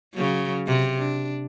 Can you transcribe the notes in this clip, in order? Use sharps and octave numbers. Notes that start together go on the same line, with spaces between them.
C#3 F#3
C3
D4